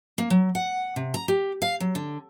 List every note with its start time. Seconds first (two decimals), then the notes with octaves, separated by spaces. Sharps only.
0.18 A#3
0.30 F#3
0.55 F#5
0.96 C3
1.14 A#5
1.28 G4
1.62 F5
1.80 F#3
1.95 D3